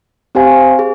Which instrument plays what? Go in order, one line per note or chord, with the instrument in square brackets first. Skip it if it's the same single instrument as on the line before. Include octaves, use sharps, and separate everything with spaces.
[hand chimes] C4 G4 C5 F5 G#5
G#4